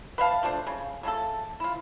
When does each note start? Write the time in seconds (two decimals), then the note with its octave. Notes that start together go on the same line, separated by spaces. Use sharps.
0.18 B4 E5 F5 A5
0.43 F3 A3 D4 C5
0.67 C#3
1.03 C#3 A3 E4 A4
1.60 E4 F4